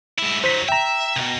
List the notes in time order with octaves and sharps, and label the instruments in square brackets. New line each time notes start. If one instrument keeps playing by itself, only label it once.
[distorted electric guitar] G#2 E4
[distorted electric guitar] D#3 F#3 [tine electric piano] C5 B6
[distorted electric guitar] E5 [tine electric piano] G5 A#5
[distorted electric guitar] C2 B2